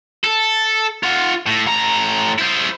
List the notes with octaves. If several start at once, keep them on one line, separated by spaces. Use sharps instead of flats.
A4
F4 F#5
A2
A2 A#5
E4 C5